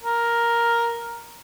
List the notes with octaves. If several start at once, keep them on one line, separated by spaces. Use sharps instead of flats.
A#4